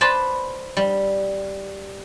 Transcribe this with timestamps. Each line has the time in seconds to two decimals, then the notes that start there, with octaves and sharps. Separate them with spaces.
0.01 B4 C5 D5 A5 B5 C6
0.77 G3